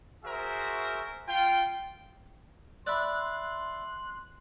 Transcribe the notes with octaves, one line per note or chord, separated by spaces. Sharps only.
F#4 G#4 A#4 C5 E5
F4 G5
D5 E5 B5 C6 F#6